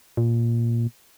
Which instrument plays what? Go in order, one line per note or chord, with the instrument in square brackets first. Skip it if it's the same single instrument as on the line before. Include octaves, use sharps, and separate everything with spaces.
[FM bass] A#2